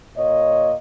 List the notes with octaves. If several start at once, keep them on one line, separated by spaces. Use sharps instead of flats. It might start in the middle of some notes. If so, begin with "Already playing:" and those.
A#2 C#5 D#5